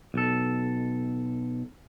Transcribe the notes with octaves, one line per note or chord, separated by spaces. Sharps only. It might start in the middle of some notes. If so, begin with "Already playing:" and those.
B1 A4